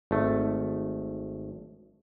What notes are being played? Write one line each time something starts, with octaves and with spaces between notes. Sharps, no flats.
G#1 A3